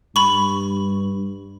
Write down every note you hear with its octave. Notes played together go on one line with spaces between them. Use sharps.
G2 B5 C#6